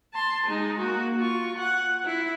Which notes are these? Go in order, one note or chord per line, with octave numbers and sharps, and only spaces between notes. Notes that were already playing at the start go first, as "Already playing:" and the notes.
A5 C6
G#3 D#4
A#3 F#4
F4 C#6
F#5
E4